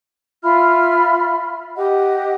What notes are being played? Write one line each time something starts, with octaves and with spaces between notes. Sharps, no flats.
F4 E5 B5 F6
G4 D#5 F#5